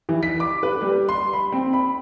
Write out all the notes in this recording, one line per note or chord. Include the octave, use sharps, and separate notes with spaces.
E3
B6
D6
B4
G3
C6
B5
C4
B5